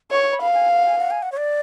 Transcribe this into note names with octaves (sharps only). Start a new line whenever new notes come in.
C#5 C#6
B5
F5
G#5
F#5
G#5
F#5
G#5
F#5
C#5
D5